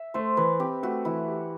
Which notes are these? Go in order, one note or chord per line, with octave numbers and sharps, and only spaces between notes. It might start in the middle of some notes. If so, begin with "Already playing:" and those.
Already playing: E5
A3 C5
E3 B4
C4 G4
A3 F#4
E3 E4
G4